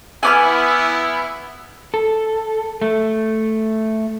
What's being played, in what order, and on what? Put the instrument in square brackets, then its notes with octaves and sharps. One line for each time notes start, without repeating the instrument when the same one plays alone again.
[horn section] B3 E4 [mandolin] G#5 D6 F6
[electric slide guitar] A4
A3